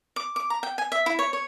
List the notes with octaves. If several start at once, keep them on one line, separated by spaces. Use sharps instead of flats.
D6
D6
A#5
G5
G#5
E5
E4
C#5
C#5